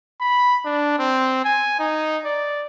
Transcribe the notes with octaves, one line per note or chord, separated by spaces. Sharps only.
B5
D4
C4
G#5
D#4
D5